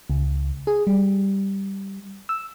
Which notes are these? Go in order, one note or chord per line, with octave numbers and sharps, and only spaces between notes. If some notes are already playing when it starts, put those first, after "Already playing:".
C#2
G#4
G3
E6